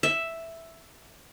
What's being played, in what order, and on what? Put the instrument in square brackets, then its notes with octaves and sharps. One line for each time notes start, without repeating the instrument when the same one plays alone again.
[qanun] E5